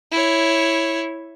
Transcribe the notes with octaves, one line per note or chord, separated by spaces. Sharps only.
E4 C#5